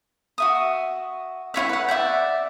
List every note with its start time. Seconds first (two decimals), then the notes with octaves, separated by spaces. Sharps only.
0.38 F#4 E5 D#6
1.54 E4 F4 C#5 E5
1.69 B4 F#5
1.89 D5 E5 F#5 G5